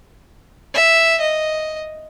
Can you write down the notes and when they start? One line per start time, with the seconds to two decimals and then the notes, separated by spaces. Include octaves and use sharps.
0.75 E5
1.21 D#5